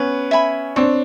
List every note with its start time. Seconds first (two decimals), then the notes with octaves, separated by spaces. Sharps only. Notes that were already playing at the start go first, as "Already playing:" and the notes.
Already playing: B3 C#4 B4
0.31 E5 G#5 B5
0.76 C4 D4 C#5